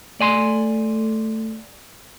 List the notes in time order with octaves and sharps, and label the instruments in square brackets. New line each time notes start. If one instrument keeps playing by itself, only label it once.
[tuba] A3 [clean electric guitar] D5 G#5 C6